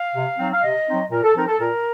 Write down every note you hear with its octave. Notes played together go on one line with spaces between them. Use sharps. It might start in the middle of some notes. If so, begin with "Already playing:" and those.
Already playing: F5
C3
F#3 C4 D#4
F5
C3 D#5
F#3 C4 D#4
A#2 A#4
A4
F3 C4 D#4 A#4
A4
A#2 A#4